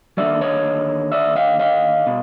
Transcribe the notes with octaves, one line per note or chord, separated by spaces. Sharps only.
D#2 D3 F#3 D5 E5
C#5 D#5
D5 E5
D#5 F5
D#5 F5
B2